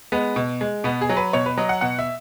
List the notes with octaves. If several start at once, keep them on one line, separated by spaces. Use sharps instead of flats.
G#3 B3
B2
G#3
B2 B3
G#4
F#3
B4
B2 C#5
B4
F#3 D#5
F#5
B2 F#5
E5